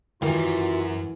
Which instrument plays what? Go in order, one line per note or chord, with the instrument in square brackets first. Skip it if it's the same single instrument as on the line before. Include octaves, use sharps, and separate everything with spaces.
[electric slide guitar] F#2 A#4 G#5 [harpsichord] D#3 [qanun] E3 [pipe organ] F4 F#4 E5